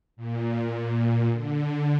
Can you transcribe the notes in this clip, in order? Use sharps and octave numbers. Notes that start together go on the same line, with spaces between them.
A#2
D3